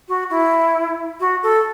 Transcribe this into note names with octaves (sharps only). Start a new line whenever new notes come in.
F#4
E4
F#4
A4